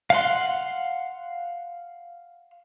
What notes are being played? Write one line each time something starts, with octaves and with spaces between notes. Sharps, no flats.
F5 F#5 C6